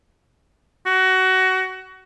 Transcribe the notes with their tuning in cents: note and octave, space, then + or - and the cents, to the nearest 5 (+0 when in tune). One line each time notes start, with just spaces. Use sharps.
F#4 +20